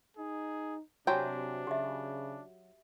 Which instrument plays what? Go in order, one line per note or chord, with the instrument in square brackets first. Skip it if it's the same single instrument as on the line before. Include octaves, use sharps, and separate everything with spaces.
[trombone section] D#4 [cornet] G#4
[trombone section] C3 [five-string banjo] F#3 G5 [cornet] D4 [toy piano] F#4 G#5
[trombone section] C#3 [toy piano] G4 E5